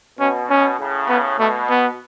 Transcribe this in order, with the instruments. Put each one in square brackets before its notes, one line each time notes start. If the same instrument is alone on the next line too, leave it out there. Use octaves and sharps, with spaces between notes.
[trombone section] B2 [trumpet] C#4
[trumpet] C#4
[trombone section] A2 C#3
[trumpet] B3
[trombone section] B2 [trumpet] A3
[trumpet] B3